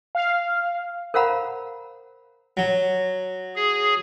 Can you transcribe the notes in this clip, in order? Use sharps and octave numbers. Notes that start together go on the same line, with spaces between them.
F5
A#4 C5 F5 F#5 A#5 B5
F#3
G#4